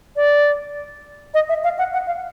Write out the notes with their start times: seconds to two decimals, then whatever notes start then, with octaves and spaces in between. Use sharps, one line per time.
0.16 D5
1.34 D#5
1.49 E5
1.64 F5
1.78 F#5
1.93 F#5
2.07 F5